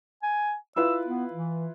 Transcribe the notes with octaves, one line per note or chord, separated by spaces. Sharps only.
G#5
E4 F4 B4 E6
B3
E3